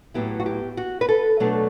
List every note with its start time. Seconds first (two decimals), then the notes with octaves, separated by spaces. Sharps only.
0.14 A2 F#3 B3 E4 G4
0.40 F#4
0.46 G4
0.77 F#4
1.01 B4
1.09 A4
1.40 B2 F#3 A3 D4